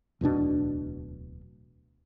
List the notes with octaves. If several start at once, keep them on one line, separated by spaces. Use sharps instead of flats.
D1 E2 B2 D4